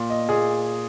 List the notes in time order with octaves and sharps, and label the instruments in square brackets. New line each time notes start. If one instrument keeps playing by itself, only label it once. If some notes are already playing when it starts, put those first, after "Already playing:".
Already playing: [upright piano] A#2
D#5
A#2 G#4